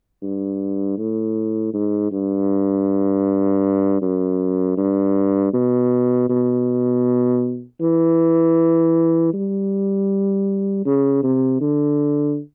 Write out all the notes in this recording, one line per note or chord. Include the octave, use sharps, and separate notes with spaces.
G2
A2
G#2
G2
F#2
G2
B2
B2
E3
G3
C#3
C3
D3